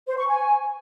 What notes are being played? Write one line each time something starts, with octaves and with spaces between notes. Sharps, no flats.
C5
C#6
G#5